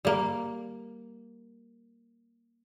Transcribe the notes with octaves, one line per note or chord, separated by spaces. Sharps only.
G3 A#3